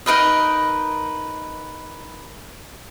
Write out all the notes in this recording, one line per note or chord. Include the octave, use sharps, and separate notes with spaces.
D#4 A#4 B4 D#5